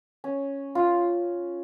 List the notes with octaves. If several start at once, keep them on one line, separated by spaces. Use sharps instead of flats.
C#4
F4